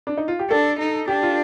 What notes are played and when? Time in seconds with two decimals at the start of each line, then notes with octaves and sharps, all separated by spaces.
0.07 D4
0.17 D#4
0.28 F4
0.39 G4
0.50 D4 A4
0.79 D#4
1.08 D4 G4
1.23 F4